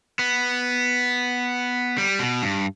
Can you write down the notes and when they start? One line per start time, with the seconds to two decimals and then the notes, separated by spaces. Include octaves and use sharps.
0.19 B3
1.98 G3
2.19 B2
2.42 G2